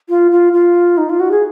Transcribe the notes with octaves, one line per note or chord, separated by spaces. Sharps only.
F4
F4
F4
D#4
F4
F#4
G#4